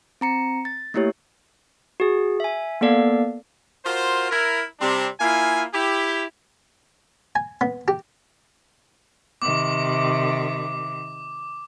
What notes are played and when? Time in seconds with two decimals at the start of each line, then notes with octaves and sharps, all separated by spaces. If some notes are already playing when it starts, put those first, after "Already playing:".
0.21 C4 A#5 C#7
0.65 A6
0.94 A3 A#3 E4 G4 C#5
2.00 F#4 G#4
2.40 E5 G#5
2.81 A#3 B3 A4 D5 F5
3.86 F4 F#4 A#4 C5
4.31 E4 A#4
4.80 C3 G3 C4 D4
5.20 A#3 E4 F4 G#5
5.74 E4 G4
7.35 G#5
7.61 B3
7.88 G4
9.42 C3 D#3 D6